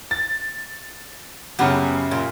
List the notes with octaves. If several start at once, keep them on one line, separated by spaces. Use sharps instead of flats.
A6
F#2 C#3 F#3 B3 G4 B4
A#2